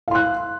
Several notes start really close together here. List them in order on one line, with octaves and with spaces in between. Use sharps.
F5 C6 F#6